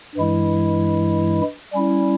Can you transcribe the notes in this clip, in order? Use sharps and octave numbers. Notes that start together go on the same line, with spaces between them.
G2 E3 G#3 E4
G3 C#4 E4